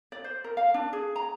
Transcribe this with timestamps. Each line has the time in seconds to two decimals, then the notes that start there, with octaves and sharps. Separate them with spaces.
0.12 D5
0.24 C5
0.44 A#4
0.57 F5
0.74 D4
0.93 G#4
1.16 A#5